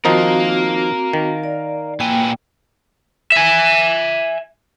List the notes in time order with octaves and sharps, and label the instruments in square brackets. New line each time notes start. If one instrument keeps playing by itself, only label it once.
[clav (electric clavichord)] D#3 F3 D#4 [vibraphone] C4 F#4 [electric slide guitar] A#4 F5
[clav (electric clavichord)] D#3
[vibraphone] D5
[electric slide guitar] A#2 B4 G#5 [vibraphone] A#3 G5
[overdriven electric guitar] E5 G#5